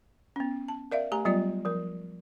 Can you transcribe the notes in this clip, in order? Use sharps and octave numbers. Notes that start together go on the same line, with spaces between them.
B3 C#4
A5
A#4 D5 E5 F5
A3 G4 G#5 A#5
F#3 G3 B3 F4 D5
F3 A#4